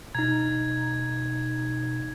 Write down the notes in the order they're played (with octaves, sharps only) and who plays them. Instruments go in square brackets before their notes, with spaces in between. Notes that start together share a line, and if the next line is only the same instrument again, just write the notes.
[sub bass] B2 [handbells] D#4 A#5 [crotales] G#6